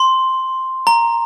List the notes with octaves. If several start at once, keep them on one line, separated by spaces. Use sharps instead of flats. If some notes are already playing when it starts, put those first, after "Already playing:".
Already playing: C6
A#5